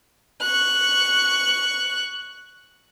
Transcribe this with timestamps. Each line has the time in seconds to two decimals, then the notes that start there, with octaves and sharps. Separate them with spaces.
0.41 C#6 F#6